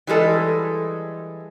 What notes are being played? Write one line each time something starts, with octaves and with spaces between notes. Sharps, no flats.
E3 G3 G#3 A4